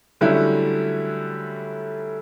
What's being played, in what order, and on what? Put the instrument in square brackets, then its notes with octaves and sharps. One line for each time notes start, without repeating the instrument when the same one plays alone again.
[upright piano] D3 F#3 G3 A3 C#4 E4